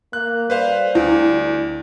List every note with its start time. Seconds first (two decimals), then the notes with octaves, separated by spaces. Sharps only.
0.13 A#3 F#6
0.50 G3 B4 C5 F5
0.95 D2 E4